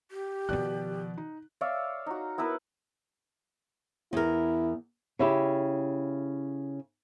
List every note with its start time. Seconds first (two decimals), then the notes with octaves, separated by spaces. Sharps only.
0.11 G4
0.49 B2 D#3 F3 D5 F#6
1.18 D#4
1.61 C#5 D5 E5 F5
2.06 D#4 F#4
2.38 B3 E4 A#4 B4
4.13 E2 E4 A#4
5.19 C#3 E4 G4